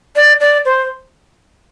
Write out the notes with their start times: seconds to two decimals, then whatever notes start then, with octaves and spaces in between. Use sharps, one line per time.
0.16 D5
0.40 D5
0.65 C5